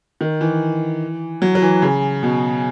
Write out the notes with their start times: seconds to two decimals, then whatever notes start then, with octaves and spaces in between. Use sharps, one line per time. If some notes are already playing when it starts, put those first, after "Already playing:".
0.21 D#3
0.41 E3
1.42 F#3
1.55 F#3
1.62 E3
1.82 C#3
2.23 B2